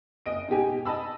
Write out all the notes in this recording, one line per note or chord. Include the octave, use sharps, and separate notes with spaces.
F#1 D#5 D7
G#2 B2 G4 G#5
D#5 A5 B5 E6